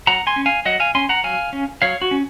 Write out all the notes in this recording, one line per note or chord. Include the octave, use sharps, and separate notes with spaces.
F#3 F#5 A#5
G#5 C6
C#4
F5 G#5
F#3 D#5 F#5
F5 G#5
C#4 G#5 C6
F#5 A#5
F#3 F5 G#5
C#4
F#3 C#5 F5
F#4
C#4